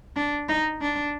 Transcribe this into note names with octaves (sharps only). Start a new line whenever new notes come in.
D4
D#4
D4